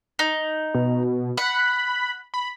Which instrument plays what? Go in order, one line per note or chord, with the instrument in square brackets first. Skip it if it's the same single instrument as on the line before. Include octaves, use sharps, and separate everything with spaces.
[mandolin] D#4
[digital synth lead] B2
[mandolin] F#5 [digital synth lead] B5
[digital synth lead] B5